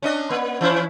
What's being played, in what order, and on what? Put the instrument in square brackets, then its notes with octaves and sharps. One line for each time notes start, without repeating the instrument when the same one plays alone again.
[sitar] C#4 D4 D#5
A#3
E3 C#4 E4